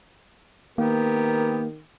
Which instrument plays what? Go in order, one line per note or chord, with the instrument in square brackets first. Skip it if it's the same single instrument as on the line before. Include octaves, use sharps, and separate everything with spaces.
[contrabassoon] D#3 [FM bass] A#3 [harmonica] B3 G4 [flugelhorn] A#4